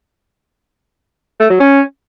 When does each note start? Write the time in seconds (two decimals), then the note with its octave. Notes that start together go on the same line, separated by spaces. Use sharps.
1.40 A3
1.50 F#3
1.60 C#4